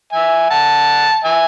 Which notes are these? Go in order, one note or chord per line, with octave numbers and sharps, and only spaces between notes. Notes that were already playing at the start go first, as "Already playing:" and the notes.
E5 G#5
F#5 A5
E5 G#5